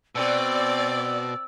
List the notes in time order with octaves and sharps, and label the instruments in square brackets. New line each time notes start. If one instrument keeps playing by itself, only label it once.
[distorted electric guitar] B2 [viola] C4 [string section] D5 [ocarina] E6